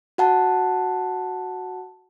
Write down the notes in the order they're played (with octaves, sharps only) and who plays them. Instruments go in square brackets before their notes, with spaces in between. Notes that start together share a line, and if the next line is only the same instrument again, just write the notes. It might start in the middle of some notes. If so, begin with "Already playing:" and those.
[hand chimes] F#4 F#5 A5